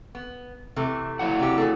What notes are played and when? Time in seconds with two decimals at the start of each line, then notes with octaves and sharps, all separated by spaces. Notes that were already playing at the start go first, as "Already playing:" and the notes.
0.15 B3
0.76 C3 E3 A3
1.19 F#3 E4 F#5
1.39 C3 E3 G4
1.58 E3 G#4 A4